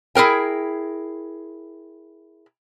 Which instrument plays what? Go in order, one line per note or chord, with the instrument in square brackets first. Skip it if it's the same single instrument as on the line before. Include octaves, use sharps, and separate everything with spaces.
[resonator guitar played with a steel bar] E4 G#4 A#4 G5